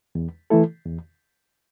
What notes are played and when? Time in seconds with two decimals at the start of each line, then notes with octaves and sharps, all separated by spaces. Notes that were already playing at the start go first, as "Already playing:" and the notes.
0.15 E2
0.50 E3 A3 E4 A4
0.85 E2